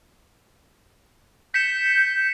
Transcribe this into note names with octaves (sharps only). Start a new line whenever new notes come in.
G6 B6 C#7 E7